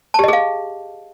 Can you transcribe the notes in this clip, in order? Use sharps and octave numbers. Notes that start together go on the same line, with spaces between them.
G4 G#4 D#5 F5 A5